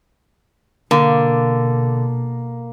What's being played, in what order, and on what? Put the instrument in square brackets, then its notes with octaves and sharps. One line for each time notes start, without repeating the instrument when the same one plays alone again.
[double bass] B2 [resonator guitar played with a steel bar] D3 [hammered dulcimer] A#3